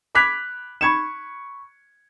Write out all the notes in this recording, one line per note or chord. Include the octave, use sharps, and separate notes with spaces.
B5 D6 F#6 G#6 B6 F7
B5 C#6 G#6 C#7 E7